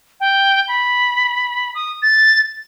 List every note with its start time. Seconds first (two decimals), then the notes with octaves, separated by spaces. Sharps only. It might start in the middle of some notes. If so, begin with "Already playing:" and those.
0.20 G5
0.68 B5
1.74 D#6
2.02 A6